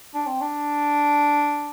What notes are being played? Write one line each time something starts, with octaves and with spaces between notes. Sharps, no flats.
D4
C4
D4